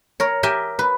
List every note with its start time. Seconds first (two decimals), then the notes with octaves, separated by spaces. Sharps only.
0.20 A#4 C#5
0.43 G4 A#4 E5 G5 G#5
0.79 B4